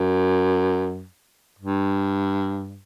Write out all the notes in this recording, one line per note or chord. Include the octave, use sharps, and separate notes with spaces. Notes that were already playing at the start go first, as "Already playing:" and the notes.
Already playing: F#2
G2